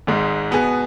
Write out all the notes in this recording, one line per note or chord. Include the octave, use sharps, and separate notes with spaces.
G#1 G#2 G#3
B2 B3 G#4